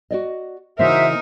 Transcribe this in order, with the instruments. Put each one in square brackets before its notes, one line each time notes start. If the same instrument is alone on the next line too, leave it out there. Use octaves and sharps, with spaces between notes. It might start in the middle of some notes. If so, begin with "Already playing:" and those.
[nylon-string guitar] F#4 D5 D#5
[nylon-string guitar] C#3 E3 A#3 [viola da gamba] D#4 A#4 [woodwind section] F#4 C5 E5